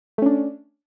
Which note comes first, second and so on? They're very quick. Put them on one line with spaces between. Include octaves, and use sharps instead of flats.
A3 C#4 D4